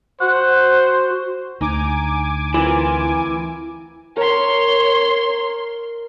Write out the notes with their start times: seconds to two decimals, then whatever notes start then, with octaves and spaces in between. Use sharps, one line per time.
0.21 F#4 C5 F#5
1.61 D2 D#4 G#5 D6
2.54 E3 C4 F4 A#4
4.17 A#4 C#5 C6